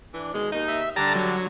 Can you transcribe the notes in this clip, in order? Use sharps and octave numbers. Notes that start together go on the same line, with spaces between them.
E3 D4
B2 D#3 G#3
D#2 D#4
E5
D3 G3 A5 A#5
F#3